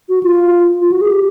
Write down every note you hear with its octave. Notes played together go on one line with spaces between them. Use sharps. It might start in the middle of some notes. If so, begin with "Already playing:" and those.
F#4
F4
F4
F#4
G#4
G4